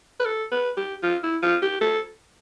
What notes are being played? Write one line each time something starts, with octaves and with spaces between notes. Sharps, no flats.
B4
A4
B4
G4
F4
E4
F4
G4
A4